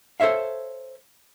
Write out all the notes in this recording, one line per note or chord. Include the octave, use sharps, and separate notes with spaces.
A4 C5 C#5 E5 F5